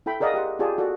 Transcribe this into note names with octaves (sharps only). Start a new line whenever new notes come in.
E4 A4 G5 B5
G#4 A#4 D5 D#5 F5 F#5
G4 F#5 C6
F4 G4 G#4 D5 A5
F#4 A4 D5